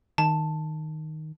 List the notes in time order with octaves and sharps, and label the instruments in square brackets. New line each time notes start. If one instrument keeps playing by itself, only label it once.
[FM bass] D#3 [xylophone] A5